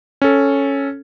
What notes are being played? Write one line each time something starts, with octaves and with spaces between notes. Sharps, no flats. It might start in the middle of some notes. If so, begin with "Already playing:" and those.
C#4 A4